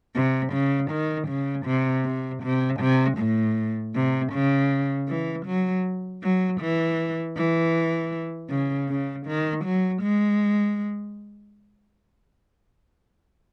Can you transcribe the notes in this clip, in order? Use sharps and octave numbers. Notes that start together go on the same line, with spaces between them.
C3
C#3
D#3
C#3
C3
C3
C3
C3
A2
C3
C#3
E3
F#3
F#3
E3
E3
C#3
C#3
D#3
F#3
G#3